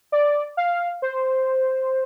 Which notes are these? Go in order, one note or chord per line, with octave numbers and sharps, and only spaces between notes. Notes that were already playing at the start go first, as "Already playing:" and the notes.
D5
F5
C5